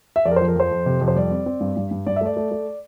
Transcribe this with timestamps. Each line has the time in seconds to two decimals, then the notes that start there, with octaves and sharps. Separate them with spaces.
0.16 E5
0.25 F2 D5
0.31 A#4
0.36 C5
0.41 F3
0.48 A#4
0.55 F2 C5
0.71 F2
0.86 C3
1.01 F2
1.08 C5
1.16 G3 D5
1.31 C4
1.46 C4
1.61 G2
1.77 G2
1.91 G2
2.06 G2 D5
2.16 E5
2.21 A3 D5
2.37 A3
2.51 A3